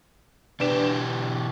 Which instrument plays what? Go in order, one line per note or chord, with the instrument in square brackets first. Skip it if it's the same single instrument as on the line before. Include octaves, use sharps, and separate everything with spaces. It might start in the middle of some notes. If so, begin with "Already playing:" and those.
[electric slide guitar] B2 E3 G4 [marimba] D4 B4 D5